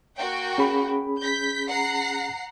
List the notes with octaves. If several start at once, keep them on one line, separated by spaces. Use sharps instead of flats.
A#3 F#4 G5
C#4 G#4 B5
G6 B6
F#5 A#5 C7